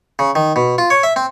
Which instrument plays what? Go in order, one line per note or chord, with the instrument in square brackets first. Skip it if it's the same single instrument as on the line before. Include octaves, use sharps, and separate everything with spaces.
[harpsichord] C#3
D#3
B2
F4
C#5
E5
C4